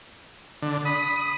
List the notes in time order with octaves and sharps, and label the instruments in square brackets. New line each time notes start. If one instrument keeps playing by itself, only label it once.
[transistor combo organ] D3
[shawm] B5 [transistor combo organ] D#6